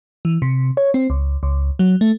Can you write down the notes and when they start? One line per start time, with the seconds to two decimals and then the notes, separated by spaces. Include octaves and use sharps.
0.25 E3
0.42 C3
0.77 C#5
0.94 C4
1.10 C#2
1.43 C#2
1.79 F#3
2.01 A3